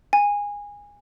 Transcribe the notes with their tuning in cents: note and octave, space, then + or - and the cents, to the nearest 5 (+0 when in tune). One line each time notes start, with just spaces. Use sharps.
G#5 -20